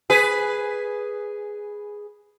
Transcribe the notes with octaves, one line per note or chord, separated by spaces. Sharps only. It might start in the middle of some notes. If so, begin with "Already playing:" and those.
G#4 B4